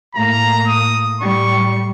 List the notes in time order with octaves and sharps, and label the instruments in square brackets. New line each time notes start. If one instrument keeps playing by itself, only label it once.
[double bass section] A2 [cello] A#3 [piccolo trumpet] A#5
[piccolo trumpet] D#6
[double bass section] A2 [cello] G3 [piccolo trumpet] C#6